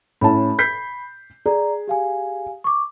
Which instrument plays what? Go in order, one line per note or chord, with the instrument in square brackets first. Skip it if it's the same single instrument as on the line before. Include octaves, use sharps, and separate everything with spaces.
[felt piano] A2 C#4 A5 [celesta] B5
[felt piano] G6 B6 C7
[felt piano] G#4 [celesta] D5 A#5
[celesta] G4 F5 G#5
C#6 D6